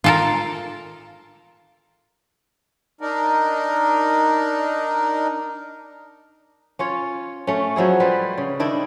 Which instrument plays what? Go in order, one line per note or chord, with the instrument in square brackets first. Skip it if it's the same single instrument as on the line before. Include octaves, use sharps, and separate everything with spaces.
[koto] F4 A4 A#4
[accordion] D4 D#4 A#4
[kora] C#4 F4 C#5
A3 C#4
F3 F#3 E4 G#4
G3 B4 C5
C#3
D#3 D4 E4 D#5